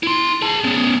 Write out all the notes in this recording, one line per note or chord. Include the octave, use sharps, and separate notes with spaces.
E4 C6
G#4 A5
B3 C#4